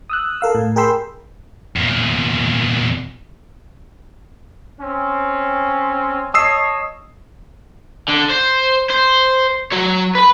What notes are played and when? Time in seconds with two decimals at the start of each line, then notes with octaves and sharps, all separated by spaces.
0.10 D#6 E6 F#6
0.41 A4 A#4 F5 E6
0.55 A2
0.76 G#4 A#4 G5 B5 C6 E6
1.76 E2 A#2
4.80 C4 C#4
6.34 C#5 D#5 A5 D#6 E6 C7
8.08 D3
8.30 C5
8.90 C5
9.72 F#3 C#5
10.15 B4 B5